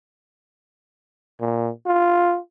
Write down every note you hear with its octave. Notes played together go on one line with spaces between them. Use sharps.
A#2
F4